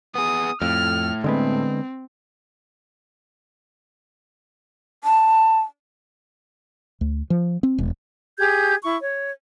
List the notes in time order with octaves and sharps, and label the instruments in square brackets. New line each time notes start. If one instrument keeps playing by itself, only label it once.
[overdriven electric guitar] B3 G#4 [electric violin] D#6
[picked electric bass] F2 [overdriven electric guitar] A2 [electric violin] F6
[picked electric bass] D3 G#3 B3 [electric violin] C4
[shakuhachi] A5
[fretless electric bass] D2
F3
C4
E1
[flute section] G4 G#4 G6 G#6
E4 C#6
C#5